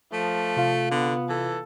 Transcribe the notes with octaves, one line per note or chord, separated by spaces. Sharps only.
F3 A3
C3 F4 F5
D3 B3
E3 A4